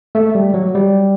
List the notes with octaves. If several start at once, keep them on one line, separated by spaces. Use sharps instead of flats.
A3
G3
F#3
G3